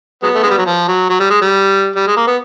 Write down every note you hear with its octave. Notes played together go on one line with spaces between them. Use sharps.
F#3 G#3 B3
A3
G#3
G3
F#3
F3
F#3
F#3
G3
G#3
G3
G3
G#3
A#3
B3